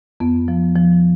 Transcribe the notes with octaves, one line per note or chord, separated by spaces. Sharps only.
F2 B3
F3
F3